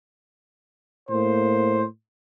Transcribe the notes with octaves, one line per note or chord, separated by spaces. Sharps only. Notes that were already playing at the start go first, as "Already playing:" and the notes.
A2 A#3 C5